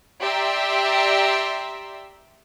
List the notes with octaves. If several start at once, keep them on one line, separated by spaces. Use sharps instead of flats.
G4 D5 E5 A#5 C6